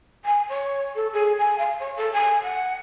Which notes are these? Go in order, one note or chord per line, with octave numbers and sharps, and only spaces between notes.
G#5
C#5
A4
G#4
G#5
F5
C#5
A4
G#5
F#5